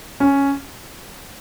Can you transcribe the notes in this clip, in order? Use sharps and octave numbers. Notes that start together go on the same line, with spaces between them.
C#4